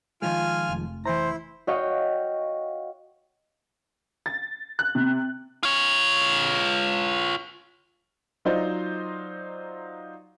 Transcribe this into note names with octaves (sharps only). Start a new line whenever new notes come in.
D#3 F3 G#3 F4 G#5 F6
F1
E3 E4 C5 A#5
F#4 C#5 D#5 F5 G5
A6
F#6
C3
F4 C#5
F#3 D#4 F4 C5 D5 D#5